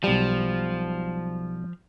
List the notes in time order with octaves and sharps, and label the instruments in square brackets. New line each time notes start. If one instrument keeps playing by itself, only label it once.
[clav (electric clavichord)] B1 G3 [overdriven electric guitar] F3